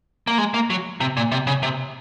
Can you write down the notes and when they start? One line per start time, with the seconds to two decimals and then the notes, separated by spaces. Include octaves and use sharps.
0.27 A#3
0.38 G#3
0.54 A#3
0.70 F#3
1.00 C3
1.17 A#2
1.32 C3
1.47 C#3
1.63 C3